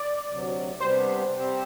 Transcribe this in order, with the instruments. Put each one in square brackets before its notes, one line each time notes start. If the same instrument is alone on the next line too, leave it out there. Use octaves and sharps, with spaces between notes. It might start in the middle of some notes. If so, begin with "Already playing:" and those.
Already playing: [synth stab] D5
[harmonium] D2 C3 F#3
[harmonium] C3 G3 B3 D4 G4 [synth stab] C5
[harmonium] C3 G3 C4 G4 C5